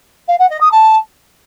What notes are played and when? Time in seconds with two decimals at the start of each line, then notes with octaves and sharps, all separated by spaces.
0.28 F5
0.39 F#5
0.49 D#5
0.60 D#6
0.71 A5